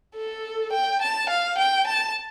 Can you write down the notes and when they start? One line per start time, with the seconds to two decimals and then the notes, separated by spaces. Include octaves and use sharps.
0.16 A4
0.73 G5
1.02 A5
1.30 F5
1.58 G5
1.87 A5